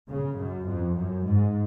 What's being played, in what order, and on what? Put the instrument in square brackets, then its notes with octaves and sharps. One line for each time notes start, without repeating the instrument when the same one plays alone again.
[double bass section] C#3
F#2
F2
F#2
G#2